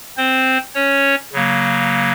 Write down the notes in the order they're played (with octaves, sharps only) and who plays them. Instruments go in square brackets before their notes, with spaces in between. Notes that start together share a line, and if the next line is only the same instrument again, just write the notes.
[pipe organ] C4 C5
C#4 C#5
C#3 F#3 A#3